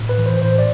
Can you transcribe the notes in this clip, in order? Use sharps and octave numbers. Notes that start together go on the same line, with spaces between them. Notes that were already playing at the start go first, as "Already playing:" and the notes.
Already playing: A2
B4
E3
C5
A2 C5
D5